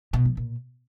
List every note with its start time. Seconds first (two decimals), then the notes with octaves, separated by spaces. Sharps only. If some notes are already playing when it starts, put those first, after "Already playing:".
0.13 B2
0.25 F3
0.37 A#2